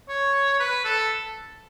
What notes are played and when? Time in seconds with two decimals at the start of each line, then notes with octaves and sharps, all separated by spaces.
0.09 C#5
0.59 B4
0.85 A4